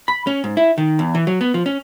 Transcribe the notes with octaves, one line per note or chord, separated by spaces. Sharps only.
B5
C#4
G#2
E4
D#3
E2
E3
F#3
B3
F3
C#4